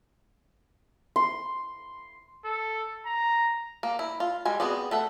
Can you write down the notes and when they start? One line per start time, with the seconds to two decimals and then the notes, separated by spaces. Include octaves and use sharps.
1.16 C6
2.45 A4
3.06 A#5
3.83 A#3
3.99 E4
4.20 F4
4.45 G3 G#3 G#5
4.60 B3 C4 F#4 G#4 D5
4.91 A3 A4 F#5